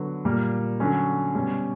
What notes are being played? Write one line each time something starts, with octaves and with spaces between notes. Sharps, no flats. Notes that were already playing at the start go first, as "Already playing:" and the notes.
Already playing: D3 F#3 B3
A#2 G3 A#3
D3 F#3 C#4
B2 G3 C#4